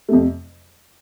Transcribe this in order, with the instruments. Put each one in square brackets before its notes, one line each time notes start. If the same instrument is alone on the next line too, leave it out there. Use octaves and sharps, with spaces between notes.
[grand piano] F2 C3 A3